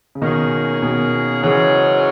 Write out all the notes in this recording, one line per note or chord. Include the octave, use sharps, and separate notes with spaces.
C#3
B2 D#3 A#3 C#4 G#4
B2 D#3
G#2 C#3 E3 F#3 C#4 G#4